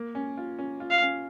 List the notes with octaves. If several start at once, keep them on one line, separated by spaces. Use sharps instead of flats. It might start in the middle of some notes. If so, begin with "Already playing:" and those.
Already playing: A#3
C#4
F4
C#4
F4
F5
C#4